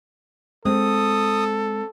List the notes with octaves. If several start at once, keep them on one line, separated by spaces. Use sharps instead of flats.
G#3 C4 A4 D#6